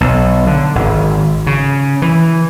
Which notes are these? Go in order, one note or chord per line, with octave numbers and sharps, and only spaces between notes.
B1
D3
G#1
C#3
E3